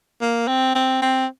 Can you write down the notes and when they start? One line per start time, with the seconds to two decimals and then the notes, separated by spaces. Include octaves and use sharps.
0.22 A#3
0.48 C4
0.75 C4
1.02 C4